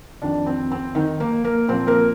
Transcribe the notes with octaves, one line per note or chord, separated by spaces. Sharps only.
F2 D#3 D4
C4
C4
D#3 D#4
A#3 A#4
A#3 A#4
A#2 F3 C4 C5
A#3 A#4